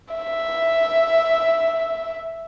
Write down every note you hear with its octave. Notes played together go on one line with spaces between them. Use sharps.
E5